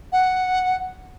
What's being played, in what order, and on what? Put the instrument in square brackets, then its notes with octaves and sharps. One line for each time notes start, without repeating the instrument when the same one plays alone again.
[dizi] F#5